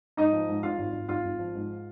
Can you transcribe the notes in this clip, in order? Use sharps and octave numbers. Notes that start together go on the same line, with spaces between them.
G#2 D#4 D#5
F3
G#2
G#1 F4 F5
G#1
G#1
G#1 F4 F5
G#1
F3
G#2